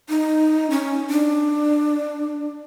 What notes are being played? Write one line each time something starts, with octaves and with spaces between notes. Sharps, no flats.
D#4
C#4
D4